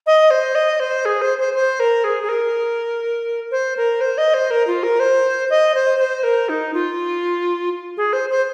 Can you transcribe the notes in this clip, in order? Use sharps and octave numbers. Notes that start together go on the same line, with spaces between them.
D#5
C5
D#5
C5
G#4
C5
C5
C5
A#4
G#4
G#4
A#4
C5
A#4
C5
D#5
C5
A#4
F4
A#4
C5
D#5
C5
C5
A#4
D#4
F4
G#4
C5
C5